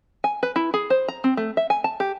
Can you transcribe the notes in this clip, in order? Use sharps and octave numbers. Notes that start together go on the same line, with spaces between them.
G#5
B4
E4
G#4
C5
A#5
C4
A3
E5
G#5
A5
G4